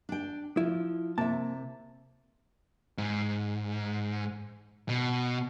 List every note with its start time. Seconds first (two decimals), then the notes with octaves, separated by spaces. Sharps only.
0.09 D4 G5
0.57 F3 E4
1.18 C3 A#3 E5 A5
2.98 G#2
4.89 B2